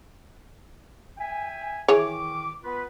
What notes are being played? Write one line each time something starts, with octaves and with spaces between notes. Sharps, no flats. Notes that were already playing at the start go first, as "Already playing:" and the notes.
E5 G5 G#5
D#3 E3 G#4 C#5 D6
B3 F4 B4